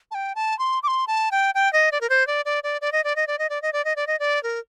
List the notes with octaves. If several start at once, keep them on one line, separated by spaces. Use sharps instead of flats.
A5
G5
A5
C6
D6
C6
A5
G5
G5
D#5
D5
A#4
C5
D5
D5
D5
D5
D#5
D5
D#5
D5
D#5
D5
D#5
D5
D#5
D5
D#5
D5
A#4